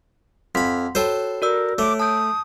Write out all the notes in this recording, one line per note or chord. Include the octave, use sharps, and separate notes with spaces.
F2 F#5 B5 C6 B6
F#4 A4 C5 C#5 G5
F#4 A#4 D5 E6
A3 C#5 D6 D7
A5 D#6 G6